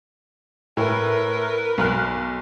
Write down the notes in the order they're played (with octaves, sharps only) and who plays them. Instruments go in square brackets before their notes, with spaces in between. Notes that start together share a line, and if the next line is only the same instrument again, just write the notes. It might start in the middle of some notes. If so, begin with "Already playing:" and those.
[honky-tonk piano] A2 [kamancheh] A#4 B4
[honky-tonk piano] B1 F6 F#6